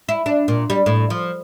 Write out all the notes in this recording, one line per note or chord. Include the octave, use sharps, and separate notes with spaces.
E4
D4
A#2
G3
A2
F3